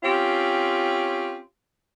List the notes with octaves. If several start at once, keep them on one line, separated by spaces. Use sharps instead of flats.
C4 C#4 F4 G4